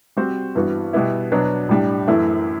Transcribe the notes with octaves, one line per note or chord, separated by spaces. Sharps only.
G3 C4 F#4 C5
G2 E3 B3 F#4
B2 G3 B3 E4
B2 F#3 B3 D4
A2 G3 D4
F#2 E3 A3 E4